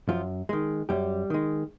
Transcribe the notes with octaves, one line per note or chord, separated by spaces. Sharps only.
F#2 F3 F4
D#3 G#3
F#2 G3 G4
D#3 G#3